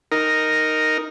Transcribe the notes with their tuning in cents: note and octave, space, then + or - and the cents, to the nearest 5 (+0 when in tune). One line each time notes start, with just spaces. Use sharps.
D#4 +0 A#4 +0